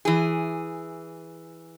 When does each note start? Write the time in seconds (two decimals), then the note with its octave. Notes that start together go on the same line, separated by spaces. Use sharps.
0.05 E3 G#4